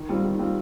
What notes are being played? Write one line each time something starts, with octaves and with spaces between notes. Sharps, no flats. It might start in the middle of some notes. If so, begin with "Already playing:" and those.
Already playing: D#3
G3 C4 F4
D#3
G3 C4 F4